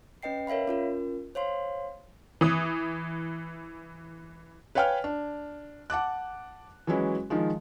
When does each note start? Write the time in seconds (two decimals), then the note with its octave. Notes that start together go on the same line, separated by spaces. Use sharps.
0.23 C#4 B4 D#5 G5 C7
0.47 A#4 C#5 E5 F5 B5
0.68 C#4 F4 A#4
1.35 C5 C#5 F5 C6
2.41 E3 D#6
4.75 B4 C#5 F5 G5 G#5 F6
5.04 D4
5.90 F#5 A5 D6 F#6
6.87 E3 F#3 G#3 C#4 E4
7.30 D#3 F3 G#3